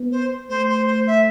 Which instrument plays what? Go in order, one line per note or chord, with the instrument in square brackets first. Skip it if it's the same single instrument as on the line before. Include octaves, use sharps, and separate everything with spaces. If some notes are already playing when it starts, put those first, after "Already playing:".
Already playing: [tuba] B3
[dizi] C5
[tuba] A3 [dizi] C5
[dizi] C5
C5
E5